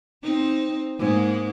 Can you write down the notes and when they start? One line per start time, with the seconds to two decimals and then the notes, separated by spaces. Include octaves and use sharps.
0.23 C4 D#4 C5
0.98 G#2 G#3 A#3